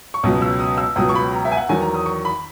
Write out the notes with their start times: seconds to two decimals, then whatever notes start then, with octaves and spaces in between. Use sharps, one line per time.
0.14 C#6
0.23 C#2 B2 F#3 D#6
0.42 E6
0.60 D#6
0.78 E6
0.96 C#2 B2 F#3 D#6
1.09 C#6
1.15 B5
1.32 A#5
1.45 E5
1.52 G#5
1.57 F#5
1.69 E2 D#3 F#3 G#5
1.82 A#5
1.94 D#6
2.06 C#6
2.25 B5